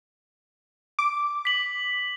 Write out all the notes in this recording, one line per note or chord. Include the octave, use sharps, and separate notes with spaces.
D6
B6 F#7